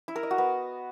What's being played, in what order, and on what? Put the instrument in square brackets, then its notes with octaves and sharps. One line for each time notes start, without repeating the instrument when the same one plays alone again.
[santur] E4
A#4
D#5
F#4
B3